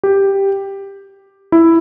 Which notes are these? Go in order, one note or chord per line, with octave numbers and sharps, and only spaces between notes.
G4
E4